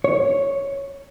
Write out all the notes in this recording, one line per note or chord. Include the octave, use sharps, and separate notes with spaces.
C#5